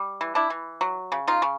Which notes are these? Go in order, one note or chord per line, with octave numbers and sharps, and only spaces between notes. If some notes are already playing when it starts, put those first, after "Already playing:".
Already playing: G3
E3
D4 E4
E3
F#3
C#3
D#4 F4
C#3